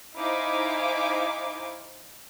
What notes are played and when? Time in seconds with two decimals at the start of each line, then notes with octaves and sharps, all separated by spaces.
0.17 D#4 E4 C5 F5 G#5 D6